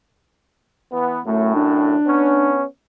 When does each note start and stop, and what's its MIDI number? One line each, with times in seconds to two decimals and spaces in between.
0.93 1.20 52
0.93 1.20 59
1.25 1.95 42
1.25 1.95 45
1.25 1.52 57
1.55 2.55 62
2.06 2.64 59
2.06 2.64 61